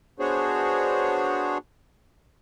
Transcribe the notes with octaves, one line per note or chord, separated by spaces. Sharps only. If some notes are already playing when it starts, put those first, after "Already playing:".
B3 D4 F#4 G#4 C5 C#5